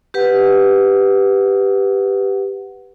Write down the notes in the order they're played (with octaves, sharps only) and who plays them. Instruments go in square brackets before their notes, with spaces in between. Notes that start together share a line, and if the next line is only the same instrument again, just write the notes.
[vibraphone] G4 B4 F#5